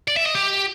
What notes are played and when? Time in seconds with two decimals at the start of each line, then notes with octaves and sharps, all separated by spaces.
0.08 D5
0.17 E5
0.26 D#5
0.35 G4